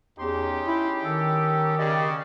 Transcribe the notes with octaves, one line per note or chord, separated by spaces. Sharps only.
E2 C#4 D#4 G4 C6
E4
D#3 A4
C#3 G4 D5 D#5